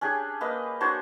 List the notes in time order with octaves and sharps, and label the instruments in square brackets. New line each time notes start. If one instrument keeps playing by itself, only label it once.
[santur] C#4 D4 G4 G#4
A#3 B4 D#5
D4 F#4 C5 C#5